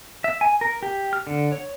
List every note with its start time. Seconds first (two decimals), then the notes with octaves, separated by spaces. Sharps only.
0.24 E5
0.41 G#5
0.61 A#4
0.83 G4
1.13 F6
1.27 D3
1.52 C#5